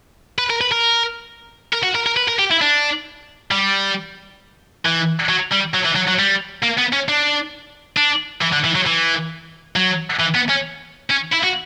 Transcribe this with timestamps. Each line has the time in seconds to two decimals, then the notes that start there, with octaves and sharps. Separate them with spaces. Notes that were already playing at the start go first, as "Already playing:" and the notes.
0.38 B4
0.50 A#4
0.61 B4
0.72 A#4
1.73 A#4
1.83 F#4
1.95 A#4
2.06 A#4
2.17 B4
2.28 A#4
2.39 G4
2.51 E4
2.62 D4
3.51 G3
4.85 E3
5.29 F#3
5.52 G3
5.75 F#3
5.86 E3
5.96 F#3
6.08 F#3
6.19 G3
6.63 A#3
6.78 B3
6.93 C#4
7.09 D4
7.97 D4
8.42 E3
8.53 D3
8.65 E3
8.76 F#3
8.87 E3
9.76 F#3
10.20 E3
10.35 B3
10.50 C#4
11.10 C#4
11.32 E4
11.43 F#4